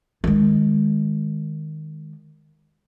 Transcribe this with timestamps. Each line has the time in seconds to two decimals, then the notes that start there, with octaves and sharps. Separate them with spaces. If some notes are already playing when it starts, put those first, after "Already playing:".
0.24 D#3 G#3